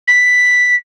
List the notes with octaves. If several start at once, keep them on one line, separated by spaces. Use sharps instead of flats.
B6